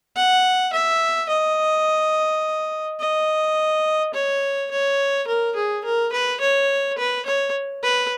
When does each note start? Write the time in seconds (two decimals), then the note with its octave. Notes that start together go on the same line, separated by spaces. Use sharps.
0.16 F#5
0.73 E5
1.29 D#5
3.00 D#5
4.14 C#5
4.71 C#5
5.27 A#4
5.55 G#4
5.85 A#4
6.13 B4
6.40 C#5
6.98 B4
7.26 C#5
7.83 B4